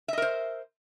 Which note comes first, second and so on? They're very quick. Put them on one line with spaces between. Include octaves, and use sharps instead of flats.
E5 D#5 A#4 C5